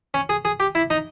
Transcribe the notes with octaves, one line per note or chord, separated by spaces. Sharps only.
C#4
G#4
G#4
G4
E4
D#4